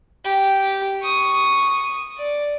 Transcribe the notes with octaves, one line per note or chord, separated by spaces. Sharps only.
G4
C#6 D#6
D5